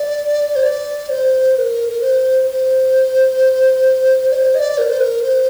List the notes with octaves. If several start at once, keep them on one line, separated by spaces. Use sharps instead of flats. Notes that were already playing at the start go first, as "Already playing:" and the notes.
Already playing: D5
C5
D5
C5
C5
A#4
A#4
C5
C5
D5
C5
D#5
D5
A#4
C5
A#4
C5